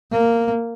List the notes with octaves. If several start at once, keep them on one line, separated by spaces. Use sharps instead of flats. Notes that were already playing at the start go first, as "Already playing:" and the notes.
A#3